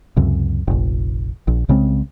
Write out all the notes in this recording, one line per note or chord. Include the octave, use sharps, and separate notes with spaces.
C#2 F#2 C3
F1 A#1
A#1
C2 C#3 G#3 C4